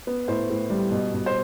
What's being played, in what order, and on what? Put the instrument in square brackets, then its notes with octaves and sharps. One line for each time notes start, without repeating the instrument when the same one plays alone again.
[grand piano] B3
[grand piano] A2 [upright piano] C5
[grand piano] A2
G3
B2
B2
[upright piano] C5